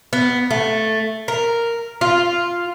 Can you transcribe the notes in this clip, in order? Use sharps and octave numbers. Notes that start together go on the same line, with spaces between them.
B3
A3
A#4
F4